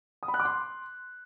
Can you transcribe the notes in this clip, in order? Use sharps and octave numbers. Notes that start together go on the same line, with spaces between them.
D#6
B5
F#6
D6
C6